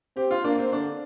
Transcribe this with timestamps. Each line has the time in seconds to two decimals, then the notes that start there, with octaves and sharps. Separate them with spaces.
0.16 C4 G4
0.31 F4
0.44 A#3 D4
0.59 C4
0.73 D3 D4